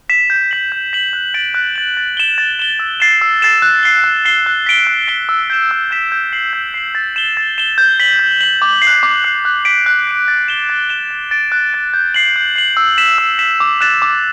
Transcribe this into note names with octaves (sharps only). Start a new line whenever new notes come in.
B6 E7
G6
B6 F#7
G6
B6 F#7
F#6
A6 D7 F#7
F#6
A6 D7 F#7
A6
E7 G7
A6
E7 G7
E6
A6 C7 E7
E6
A6 C7 E7
F#6
C7 G7
F#6
C7 G7
F#6
B6 D7 G7
F#6
B6 D7 G7
E6
G6 B6 E7
E6
G6 B6 E7
G6
C7 F#7
G6
C7 F#7
A6
E7 G7
A6
E7 G7
G6
B6 F#7
G6
B6 F#7
D6
C7
F#6
D6
F#6 C7
F#6
B6 D7
F#6
B6 D7
A6
E7 G7
A6
E7 G7
F#6
A6 D7
F#6
A6 D7
G6
C7 F#7
G6
C7 F#7
E6
B6 E7
E6
B6 E7
D6
F#6 A6 E7
D6